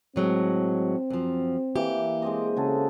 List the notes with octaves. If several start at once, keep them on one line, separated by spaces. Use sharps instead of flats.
A2 F#3 G#3 C4
F#2 F3
E3 A#3 G4
G#3 C4 D#5
C#3 F#4 G#4 A4